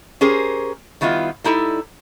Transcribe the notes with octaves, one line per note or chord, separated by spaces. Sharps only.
C#4 G4 G#4 A#4 C5
D#3 G3 B3 E4 F4
G3 D#4 E4 A4